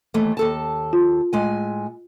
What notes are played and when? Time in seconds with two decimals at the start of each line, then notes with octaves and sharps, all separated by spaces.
0.14 D#2 E3 A3
0.37 D#2 A4 A5
0.93 F4
1.33 A2 G#3 G#5